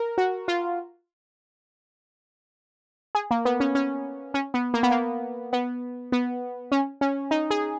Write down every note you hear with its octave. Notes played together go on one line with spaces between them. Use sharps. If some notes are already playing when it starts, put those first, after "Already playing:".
Already playing: A#4
F#4
F4
G#4
A#3
B3
C#4
C#4
C#4
B3
A#3
B3
A#3
B3
B3
C#4
C#4
D#4
G#4